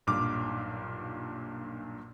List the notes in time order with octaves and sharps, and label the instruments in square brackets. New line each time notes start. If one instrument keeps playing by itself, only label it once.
[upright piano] B1 G2 A#2 D6 F6